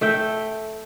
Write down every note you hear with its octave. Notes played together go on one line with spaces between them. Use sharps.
A3 E5 G5